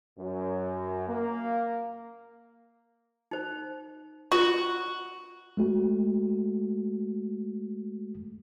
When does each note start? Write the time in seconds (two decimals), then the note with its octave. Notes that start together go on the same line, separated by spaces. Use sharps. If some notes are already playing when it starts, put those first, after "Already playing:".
0.19 F#2
1.08 A#3
3.31 D#4 C5
4.32 F4 F#4
5.57 G#3 A3 F#4